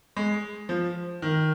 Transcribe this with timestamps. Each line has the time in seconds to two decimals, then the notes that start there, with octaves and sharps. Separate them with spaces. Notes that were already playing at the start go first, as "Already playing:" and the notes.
0.17 G#3
0.69 F3
1.22 D#3